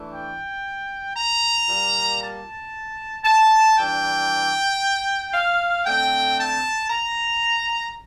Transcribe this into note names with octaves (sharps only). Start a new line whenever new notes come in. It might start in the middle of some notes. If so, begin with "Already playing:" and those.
Already playing: E3 A3 D4
G5
A#5
A#2 G3 A#3
A5
A5
E3 G3 D4 G5
F5
D3 A3 C4 G5
A5
A#5